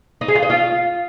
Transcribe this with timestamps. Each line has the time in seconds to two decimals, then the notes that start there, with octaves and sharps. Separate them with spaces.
0.21 D#4
0.28 G#4
0.35 F4
0.43 D#5
0.50 F4